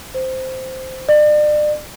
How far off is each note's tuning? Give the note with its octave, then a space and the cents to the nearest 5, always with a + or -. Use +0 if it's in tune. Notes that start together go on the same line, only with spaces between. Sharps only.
C5 -5
D5 +35